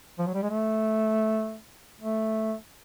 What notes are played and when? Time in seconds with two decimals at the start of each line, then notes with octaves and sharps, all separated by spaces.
0.19 F3
0.27 F#3
0.34 G3
0.43 G#3
0.50 A3
2.01 A3